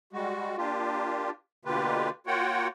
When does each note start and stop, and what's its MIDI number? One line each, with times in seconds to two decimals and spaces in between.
0.13 0.56 55
0.13 0.56 56
0.13 0.56 66
0.57 1.30 58
0.57 1.30 62
0.57 1.30 65
0.57 1.30 67
1.65 2.10 47
1.65 2.10 50
1.65 2.10 58
1.65 2.10 65
1.65 2.10 67
1.65 2.10 71
2.27 2.68 58
2.27 2.68 65
2.27 2.68 66
2.27 2.68 73
2.27 2.68 78
2.27 2.68 79